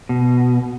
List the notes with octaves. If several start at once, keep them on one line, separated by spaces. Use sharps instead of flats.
B2